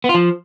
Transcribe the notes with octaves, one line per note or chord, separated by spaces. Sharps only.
B3
F4
F3